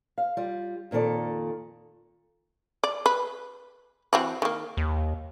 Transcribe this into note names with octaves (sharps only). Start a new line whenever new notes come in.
F5
G3 F4
F2 A#2 D#3 A4 D5
D5
B4
E3 C4 F#4
D#3 A#3
D#2